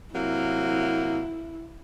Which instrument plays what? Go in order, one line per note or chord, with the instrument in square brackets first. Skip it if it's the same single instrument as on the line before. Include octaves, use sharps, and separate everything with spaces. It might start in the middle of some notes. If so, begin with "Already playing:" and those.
[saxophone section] C3 F#3 A#3 [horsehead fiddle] E4